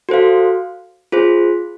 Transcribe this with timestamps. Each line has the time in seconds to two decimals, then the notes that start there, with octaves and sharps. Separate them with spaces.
0.09 F#4 A4 C5 F5
1.12 F4 G#4 C5